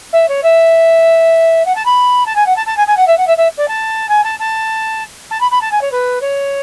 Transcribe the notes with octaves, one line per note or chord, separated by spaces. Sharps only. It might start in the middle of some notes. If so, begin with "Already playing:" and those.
E5
C#5
E5
F#5
A5
B5
A5
G#5
F#5
A5
A5
G#5
G#5
F#5
E5
F#5
E5
E5
D5
A5
G#5
A5
A5
A5
B5
B5
A5
G#5
C#5
B4
C#5